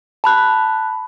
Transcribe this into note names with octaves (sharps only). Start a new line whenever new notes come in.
A5 B5 F#6